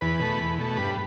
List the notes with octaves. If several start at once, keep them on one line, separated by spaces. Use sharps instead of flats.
E2 B4
B2 A3
E2
B2 A3
G2 B4